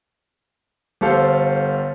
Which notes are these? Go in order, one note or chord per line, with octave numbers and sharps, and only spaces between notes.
G1 G4 A4 C5 F5